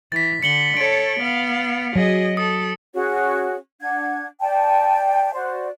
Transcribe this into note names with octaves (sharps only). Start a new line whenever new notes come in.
E3 A6 B6
D3 C#7 F#7 G7
A4 C#5 D7
B3 F5
F#3 G#4 D#5
A4 D#6
C#4 F#4 G#4 C#5
D4 F#5 G#6
D5 G5 A5
F#4 C5 D5